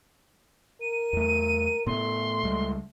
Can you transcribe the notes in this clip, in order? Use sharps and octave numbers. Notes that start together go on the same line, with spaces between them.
A#4 D#7
E2 A3
A2 A3 B3 C6
C#2 G3 G#3